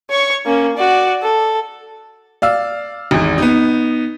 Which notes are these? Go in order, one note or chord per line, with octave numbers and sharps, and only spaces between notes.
C#5 C#6
A#3 C#4
F#4 D5
A4
D5 F5 E6
G#1 E2
B3 D#4